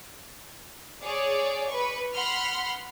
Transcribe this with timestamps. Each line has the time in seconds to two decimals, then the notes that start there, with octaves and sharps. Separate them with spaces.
1.02 G#4 C#5 D5
1.68 B4 C#6
2.14 F#5 B5 C6 F6